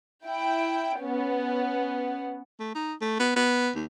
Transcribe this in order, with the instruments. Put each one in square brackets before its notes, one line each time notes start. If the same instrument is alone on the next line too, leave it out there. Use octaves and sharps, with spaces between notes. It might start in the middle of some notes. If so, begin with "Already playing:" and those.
[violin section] E4 G5
B3 C#4
[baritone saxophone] A3
D#4
A3
B3
B3
D#2